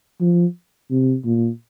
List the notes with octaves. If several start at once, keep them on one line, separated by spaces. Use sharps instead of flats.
F3
C3
A#2